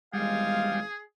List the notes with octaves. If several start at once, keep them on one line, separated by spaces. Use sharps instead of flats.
G#1 E2 G3 G#3 G#4 F5